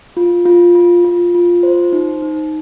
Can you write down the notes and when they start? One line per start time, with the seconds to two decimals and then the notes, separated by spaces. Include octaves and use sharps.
0.17 F4
0.46 F4
0.75 F4
1.05 F4
1.35 F4
1.63 C5
1.93 D#4
2.22 D#4